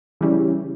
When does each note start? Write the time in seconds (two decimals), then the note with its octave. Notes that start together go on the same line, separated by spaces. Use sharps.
0.21 C#3 E3 G3 C#4 E4